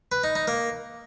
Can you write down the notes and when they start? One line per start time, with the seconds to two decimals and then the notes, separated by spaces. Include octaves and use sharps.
0.12 B4
0.24 D#4
0.36 D#4
0.47 A#3